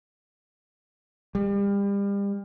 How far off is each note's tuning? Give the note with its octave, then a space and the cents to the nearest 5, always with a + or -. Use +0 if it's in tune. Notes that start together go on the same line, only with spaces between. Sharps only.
G3 +35